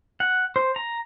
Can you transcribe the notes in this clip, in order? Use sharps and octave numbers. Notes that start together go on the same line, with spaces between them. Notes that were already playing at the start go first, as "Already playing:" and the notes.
F#5
C5
A#5